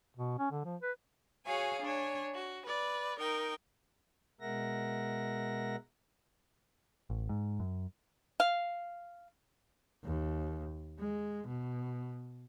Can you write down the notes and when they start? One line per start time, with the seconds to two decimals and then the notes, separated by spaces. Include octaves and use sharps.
0.17 B2
0.39 C#4
0.51 D3
0.65 F3
0.82 B4
1.46 F#4 G#4 C#5 F5 G#5
1.82 D4 C#5 G#5
2.33 F#4
2.64 B4 D5
3.18 D#4 A#4 G5
4.41 B2 G#3 A#4 E5 F#5 A#6
7.10 A1
7.29 G#2
7.60 F#2
8.40 F5
10.04 D#2
10.99 G#3
11.47 B2